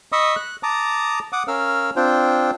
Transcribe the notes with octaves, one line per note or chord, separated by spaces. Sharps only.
D#5 B5 C#6 D#6 E6
F#6
A5 A#5 D6 D#6
F#5 D6 D#6
C#4 A#4 F5 E6 F6
C4 D4 F4 C5 G5